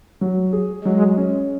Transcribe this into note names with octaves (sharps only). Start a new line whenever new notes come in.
F#3
G#4
F#3 G#3
C#4